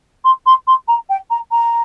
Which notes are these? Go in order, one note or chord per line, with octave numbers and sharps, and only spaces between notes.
C6
C6
C6
A#5
G5
A#5
A#5